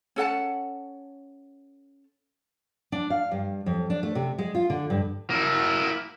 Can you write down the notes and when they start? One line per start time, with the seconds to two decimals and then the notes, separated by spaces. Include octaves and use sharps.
0.16 C#4 A4 F#5 A5
2.92 D4
3.10 F5
3.31 G2
3.66 F2
3.90 D4
4.03 A3
4.15 C3
4.38 G#3
4.55 F4
4.70 D3
4.90 G2
5.30 A#3 E4